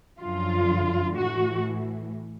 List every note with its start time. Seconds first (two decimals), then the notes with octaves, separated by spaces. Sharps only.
0.20 F#2 D3 F3 F4
1.16 A2 E3 F#4